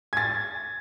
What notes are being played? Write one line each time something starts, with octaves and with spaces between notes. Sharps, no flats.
G#6 A6